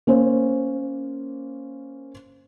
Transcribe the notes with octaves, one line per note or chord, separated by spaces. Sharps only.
A#3 C#4 C5